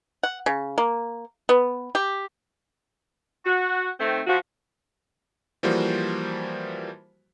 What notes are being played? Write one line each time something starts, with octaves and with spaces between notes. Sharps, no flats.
F#5
C#3
A#3
B3
G4
F#4
D#3 A3 C4
F3 F#4
E3 F3 G3 A#3 F#4 C5